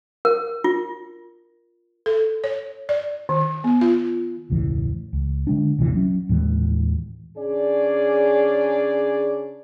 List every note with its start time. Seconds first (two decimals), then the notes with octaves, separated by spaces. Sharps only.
0.25 A#4
0.64 F4
2.06 A4
2.44 C#5
2.89 D5
3.29 D#3
3.64 B3
3.81 F4
4.50 E1 C#2 A2 E3
5.13 C#2
5.47 D3 G#3 D4
5.79 A#1 E2 C3 E3
5.95 F#3 C#4
6.29 D#2 A2 E3 G#3
7.37 C#3 C#4 D4 G#4 D5